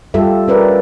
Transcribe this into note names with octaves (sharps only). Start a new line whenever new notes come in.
G3 F4 G4 A4 E5
C#4 A#4 B4 D5